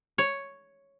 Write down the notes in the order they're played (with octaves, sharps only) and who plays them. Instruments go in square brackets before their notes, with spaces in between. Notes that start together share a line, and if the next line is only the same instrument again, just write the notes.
[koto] C#5